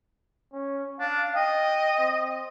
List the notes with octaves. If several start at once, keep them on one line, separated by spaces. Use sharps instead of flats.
C#4
D4 F5
D#5 G5
C4